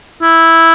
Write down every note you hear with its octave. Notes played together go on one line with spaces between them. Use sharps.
E4